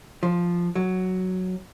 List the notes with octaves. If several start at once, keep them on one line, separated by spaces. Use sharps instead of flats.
F3
F#3